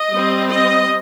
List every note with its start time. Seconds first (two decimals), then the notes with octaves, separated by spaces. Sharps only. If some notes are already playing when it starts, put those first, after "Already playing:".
Already playing: D#5
0.10 G3 C4
0.50 D#5